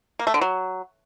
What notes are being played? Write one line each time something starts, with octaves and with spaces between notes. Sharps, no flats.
A#3
A3
D3
F#3